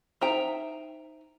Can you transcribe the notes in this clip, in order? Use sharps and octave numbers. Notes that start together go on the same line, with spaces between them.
D#4 C5 E5 G5 A#5